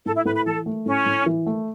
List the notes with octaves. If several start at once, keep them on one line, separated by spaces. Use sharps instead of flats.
A2 A4
E4
A2 B4
B4
E3 A4
A3
A2 C#4
A2
E3
A3